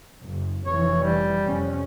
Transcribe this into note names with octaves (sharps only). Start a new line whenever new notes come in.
F#1
F1 E3 C#5
G3
F2 C3 C#4